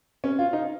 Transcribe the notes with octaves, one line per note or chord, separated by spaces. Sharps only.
C#4
F4
D#4